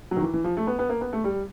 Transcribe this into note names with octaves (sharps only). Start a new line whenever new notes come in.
F#3
D#3
E3
E3
F3
A3
B3
B3
A#3
B3
A3
G3